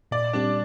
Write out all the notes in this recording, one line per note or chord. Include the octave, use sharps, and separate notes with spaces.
A#2 D5
G3 C4 D4 G4